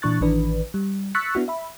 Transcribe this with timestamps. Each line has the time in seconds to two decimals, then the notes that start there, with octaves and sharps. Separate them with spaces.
0.02 A#2 E3 D4 C#6 F#6 A6
0.20 A1 D#3 E3 D4 B4
0.74 G3
1.15 C#6 E6 F#6 A6 B6 C#7
1.35 B3 D4 E4 F#4
1.48 E5 B5